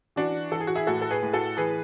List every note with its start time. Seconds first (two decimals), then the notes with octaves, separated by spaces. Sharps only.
0.16 E3 D4 F#4
0.51 E3 A4
0.60 G#4
0.67 F#4
0.75 E4 G#4
0.87 A2 F#4 A4
1.02 A4
1.11 G#4 B4
1.23 A2
1.33 F#4 A4
1.57 E3 G#4 B4